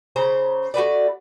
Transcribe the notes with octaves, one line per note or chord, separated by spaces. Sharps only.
C#3 C5 A#5
A3 F#4 B4 D5